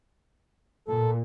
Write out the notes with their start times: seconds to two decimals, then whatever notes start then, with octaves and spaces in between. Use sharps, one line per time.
0.88 A#2 A4